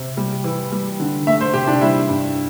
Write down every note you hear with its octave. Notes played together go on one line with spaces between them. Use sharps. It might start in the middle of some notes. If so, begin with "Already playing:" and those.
Already playing: C3
G3
E3
G3
D3
A3 E5
C5
C3 G4
D4
G3 E4
G2